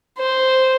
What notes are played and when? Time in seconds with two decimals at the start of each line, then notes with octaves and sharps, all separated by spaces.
0.18 C5